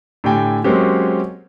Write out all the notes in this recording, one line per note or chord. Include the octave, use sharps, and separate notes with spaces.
A2 D3 G4 G5 G#5
F#3 G#3 A#3 C4 C#4 G4